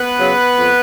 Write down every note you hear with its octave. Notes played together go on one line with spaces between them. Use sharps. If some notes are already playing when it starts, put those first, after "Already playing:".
Already playing: B3 B4
C#3 F#3
F2